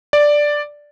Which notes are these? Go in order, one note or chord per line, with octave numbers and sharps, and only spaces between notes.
D5